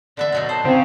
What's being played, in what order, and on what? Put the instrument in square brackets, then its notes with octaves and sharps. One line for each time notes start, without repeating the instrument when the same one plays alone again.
[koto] D3 B3 E5 [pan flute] D5
[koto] B2 F#3 D#4
[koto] C5 [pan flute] A5
[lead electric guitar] C#3 [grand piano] C4 [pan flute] F5